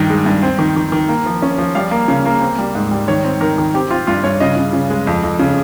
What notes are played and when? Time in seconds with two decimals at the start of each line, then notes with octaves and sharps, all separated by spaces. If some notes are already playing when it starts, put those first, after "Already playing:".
Already playing: G2 D#3 G5
0.10 G#3
0.26 G2
0.43 C4
0.59 D#3
0.76 D#3
0.92 D#3
1.09 A#3
1.26 F3
1.42 C#4
1.58 F3
1.75 G3 F5
1.91 A#3
2.08 C#3
2.26 A#3
2.41 C4
2.59 G3
2.75 G#2
2.91 G3
3.08 D#3 C#5
3.24 C4
3.41 D#3 A#4
3.58 D#3
3.74 C4 G4
3.91 C4 F4
4.07 G2 F4
4.24 G2 C#5
4.40 C#3 D#5
4.56 C#3
4.73 C#3
4.90 G#3
5.07 F2
5.23 F2
5.39 C#3